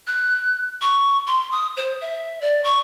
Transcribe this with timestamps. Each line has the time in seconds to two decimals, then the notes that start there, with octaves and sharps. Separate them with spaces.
0.07 F#6
0.81 C#6
1.27 C6
1.51 D#6
1.77 C5
2.01 E5
2.41 D5
2.64 C#6